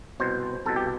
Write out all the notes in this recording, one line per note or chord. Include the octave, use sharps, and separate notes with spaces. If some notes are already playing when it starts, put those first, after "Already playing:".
C2 B2 C5
C2 B2 A4
G4